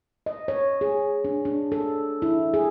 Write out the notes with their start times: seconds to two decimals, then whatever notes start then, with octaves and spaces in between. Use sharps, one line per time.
0.26 D#5
0.48 C#5
0.81 G#4
1.24 D4
1.45 D4
1.72 A4
2.22 E4
2.54 G#4